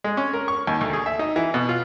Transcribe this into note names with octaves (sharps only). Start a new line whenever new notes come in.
G#3
C#4
A#4
C#6
D#2
D2
G#4
E5
D#4
E3
B2
F4